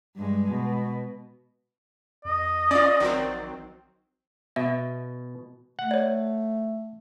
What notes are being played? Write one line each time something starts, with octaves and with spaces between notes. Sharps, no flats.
G2 G#3
B2
F2 D#5
C#4 F4 D5
A#1 D#3 F#3 C4
B2 E5
A3 F#5
C#5 D5